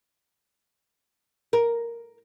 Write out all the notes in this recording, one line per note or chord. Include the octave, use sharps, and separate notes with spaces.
A#4